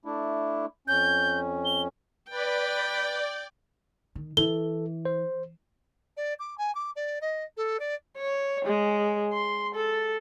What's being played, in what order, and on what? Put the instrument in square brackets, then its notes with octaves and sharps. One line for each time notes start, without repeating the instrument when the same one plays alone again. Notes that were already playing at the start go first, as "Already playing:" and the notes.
[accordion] A3 D4 E4
[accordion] F2 C#4 [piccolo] G6
[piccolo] G7
[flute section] B4 [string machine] D5 [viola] G5
[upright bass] D#3
[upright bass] E3 [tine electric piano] A4 [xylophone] G7
[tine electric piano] C5
[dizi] D5
D6
G#5
D6
D5
D#5
A4
D5
[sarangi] C#5
G#3
C6
A4